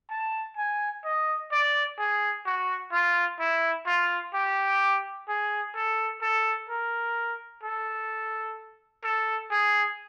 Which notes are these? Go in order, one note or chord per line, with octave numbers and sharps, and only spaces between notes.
A5
G#5
D#5
D5
G#4
F#4
F4
E4
F4
G4
G#4
A4
A4
A#4
A4
A4
G#4